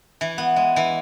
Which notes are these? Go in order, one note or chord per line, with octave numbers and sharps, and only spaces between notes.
E3
B3
G#3
E3